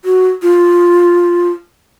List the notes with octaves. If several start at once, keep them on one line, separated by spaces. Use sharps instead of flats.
F#4
F4